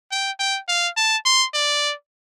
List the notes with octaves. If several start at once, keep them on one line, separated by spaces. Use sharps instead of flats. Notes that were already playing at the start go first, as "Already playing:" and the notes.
G5
G5
F5
A5
C6
D5